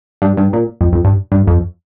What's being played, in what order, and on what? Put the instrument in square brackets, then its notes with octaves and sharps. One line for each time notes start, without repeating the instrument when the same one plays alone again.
[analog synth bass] G2
G2
A#2
F2
F2
G2
G2
F2